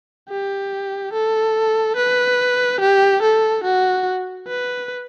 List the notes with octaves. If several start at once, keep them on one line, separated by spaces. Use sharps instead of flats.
G4
A4
B4
G4
A4
F#4
B4